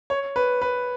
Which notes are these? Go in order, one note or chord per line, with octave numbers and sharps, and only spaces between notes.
C#5
B4
B4